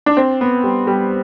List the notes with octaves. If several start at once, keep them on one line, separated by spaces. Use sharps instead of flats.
D4
C4
B3
G3
G3